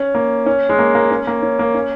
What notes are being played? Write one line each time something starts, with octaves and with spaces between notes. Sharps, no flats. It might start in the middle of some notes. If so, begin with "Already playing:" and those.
Already playing: C#4
A#3
C#4
G#3
A#3
A#3
C#4
A#3
C#4
A#3
C#4